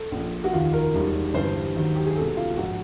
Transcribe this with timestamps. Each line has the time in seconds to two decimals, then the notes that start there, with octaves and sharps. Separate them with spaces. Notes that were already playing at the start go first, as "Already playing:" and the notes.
Already playing: A4
0.12 A#1 A#2 F3
0.44 F#4
0.53 F1 D#2 D#3 F4
0.73 A#4
0.94 E1 D#2 D#3 G3
1.34 G1 G2 E3 G3 C5
1.75 D#2 D#3 F#3
1.96 G4
2.06 G#4
2.16 C2 B2 F#3 A4
2.37 F4
2.57 A#1 G#2 F3 F#4